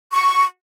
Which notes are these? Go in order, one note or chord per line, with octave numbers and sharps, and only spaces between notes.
C#6